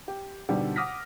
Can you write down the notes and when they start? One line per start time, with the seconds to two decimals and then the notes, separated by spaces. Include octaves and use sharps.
0.08 G4
0.49 G#2 B2 D3 G3 G4
0.76 F#5 D6 D#6 F6 A#6 B6